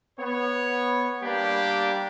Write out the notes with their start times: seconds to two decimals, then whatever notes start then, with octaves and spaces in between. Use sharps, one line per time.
0.18 B3 C#5
1.22 G3 A#3 D4 G4